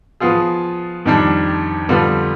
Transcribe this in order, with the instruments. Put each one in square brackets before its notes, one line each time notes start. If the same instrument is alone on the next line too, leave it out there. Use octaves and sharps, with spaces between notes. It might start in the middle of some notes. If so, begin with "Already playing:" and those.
[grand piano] F3 B3 F4 G#4
F2 D#3 G3 D4
F2 D3 G3 B3 F4